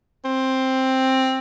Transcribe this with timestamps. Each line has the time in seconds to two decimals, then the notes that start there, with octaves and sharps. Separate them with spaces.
0.24 C4